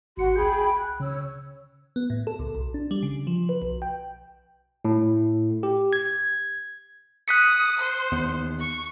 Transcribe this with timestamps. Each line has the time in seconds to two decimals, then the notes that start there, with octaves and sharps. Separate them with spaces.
0.17 G#1 F#4 C6 C#7
0.36 C#2 G#4 G5 B5 G6
0.77 F#6
1.00 C#3 C#5 E6
1.96 B3
2.10 A2
2.27 A4
2.39 C#2
2.55 B1
2.74 D4
2.91 G3
3.03 C#3
3.27 F3
3.49 B4
3.62 B1
3.82 G5
4.85 A2
5.63 G4
5.93 G#6
7.28 D#6 F#6 B6 C#7
7.79 C5
8.12 D#2 B3
8.60 C#6